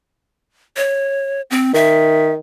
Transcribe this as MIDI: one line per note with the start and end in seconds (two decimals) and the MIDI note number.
0.77 1.41 73
1.50 1.72 60
1.74 2.37 51
1.74 2.32 76